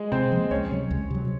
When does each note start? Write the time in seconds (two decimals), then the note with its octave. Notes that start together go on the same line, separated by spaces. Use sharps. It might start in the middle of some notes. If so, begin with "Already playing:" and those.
Already playing: G#3 G#4
0.12 C3 C4 C5
0.32 F3 A#3
0.51 C#2 C#4 C#5
0.71 C3 F#3
0.91 C#2
1.10 C3 F#3